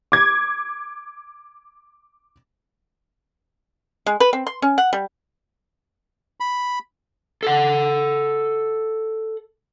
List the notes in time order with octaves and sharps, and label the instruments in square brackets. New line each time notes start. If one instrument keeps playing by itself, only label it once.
[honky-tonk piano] D6 G#6
[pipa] G#3
B4
C4
C6
C#4
F#5
G3
[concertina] B5
[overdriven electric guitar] A4 F#5